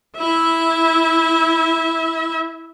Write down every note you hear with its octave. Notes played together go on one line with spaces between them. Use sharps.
E4 E5